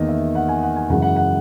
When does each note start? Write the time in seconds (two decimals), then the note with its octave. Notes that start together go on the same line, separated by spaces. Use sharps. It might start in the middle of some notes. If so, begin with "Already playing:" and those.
Already playing: E2 D#3 A#3 D#5
0.09 E5
0.35 F#5
0.48 G#5
0.63 F#5
0.76 G#5
0.89 F#2 C#3 E3 G#3 F#5
1.02 F#5
1.16 F#5